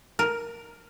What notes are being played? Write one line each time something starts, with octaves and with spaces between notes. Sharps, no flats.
A#4